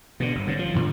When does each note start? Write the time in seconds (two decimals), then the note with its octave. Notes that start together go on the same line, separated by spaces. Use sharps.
0.20 B2 D3
0.35 G1
0.47 G#2 C#3
0.59 F3
0.74 G#2 B2 D3 D#3